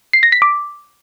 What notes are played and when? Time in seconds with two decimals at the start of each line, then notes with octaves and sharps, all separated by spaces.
0.13 C7
0.23 A#6
0.32 B6
0.42 D6